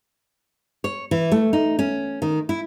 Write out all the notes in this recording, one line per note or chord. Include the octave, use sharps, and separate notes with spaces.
C#5
E3
A3
D#4
C#4
D#3
E4